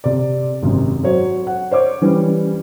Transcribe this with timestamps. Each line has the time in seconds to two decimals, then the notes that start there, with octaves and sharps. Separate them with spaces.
0.04 C3 D5
0.62 G#1 F#2 C3
1.03 F#3 C5 C#5
1.47 F#5
1.71 C5 C#5 D6
2.02 E3 G3 C#4